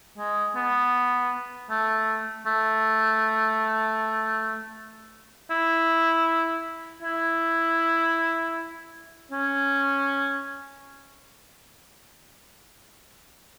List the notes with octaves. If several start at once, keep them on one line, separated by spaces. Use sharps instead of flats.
G#3
B3
A3
A3
E4
E4
C#4